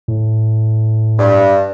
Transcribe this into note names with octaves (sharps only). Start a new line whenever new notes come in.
A2
G2